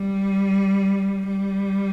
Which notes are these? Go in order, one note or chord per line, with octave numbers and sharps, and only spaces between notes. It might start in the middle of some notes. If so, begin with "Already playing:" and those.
Already playing: G3
G3